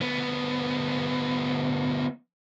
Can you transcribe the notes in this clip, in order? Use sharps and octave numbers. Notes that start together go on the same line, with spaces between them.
D2 B3